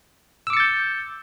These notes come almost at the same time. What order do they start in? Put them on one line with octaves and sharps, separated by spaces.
E6 D6 C#7 A6 G6